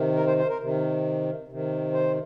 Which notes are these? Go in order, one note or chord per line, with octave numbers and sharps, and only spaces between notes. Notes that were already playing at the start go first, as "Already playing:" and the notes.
Already playing: C3 D#3
A#4
C5
C5
A#4
C3 D#3
C3 D#3
C5